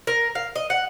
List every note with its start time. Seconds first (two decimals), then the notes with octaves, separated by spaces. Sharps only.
0.07 A#4
0.35 F5
0.56 D#5
0.70 F#5